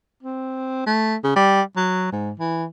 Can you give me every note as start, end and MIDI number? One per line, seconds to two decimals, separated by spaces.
0.23 0.87 60
0.87 1.16 57
1.24 1.31 49
1.36 1.61 55
1.76 2.12 54
2.12 2.31 44
2.39 2.66 52